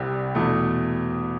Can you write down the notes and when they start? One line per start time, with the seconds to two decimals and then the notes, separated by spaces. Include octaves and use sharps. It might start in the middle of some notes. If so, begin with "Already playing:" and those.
Already playing: C2 C3 G3
0.35 E2 B2 A3